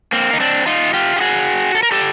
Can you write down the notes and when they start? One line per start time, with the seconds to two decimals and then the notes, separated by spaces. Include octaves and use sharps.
0.13 A#3 C4
0.33 D#4
0.40 C4 D4
0.66 D#4 F4
0.93 F4 G4
1.16 G4
1.21 F#4 G#4
1.75 A4
1.83 A#4
1.91 G4 A4